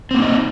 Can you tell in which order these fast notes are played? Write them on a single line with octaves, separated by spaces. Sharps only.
C4 A#3 D#4 D#5